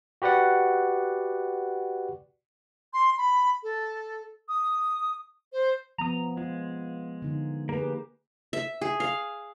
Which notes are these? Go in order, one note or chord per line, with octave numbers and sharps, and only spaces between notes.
F#4 G4 B4 D5 F#5
C6
B5
A4
D#6
C5
F3 B3 A#5 D#6
G#3 F4
D3 D#4
A#3 G4 G#4 B4
E5
G#4
F5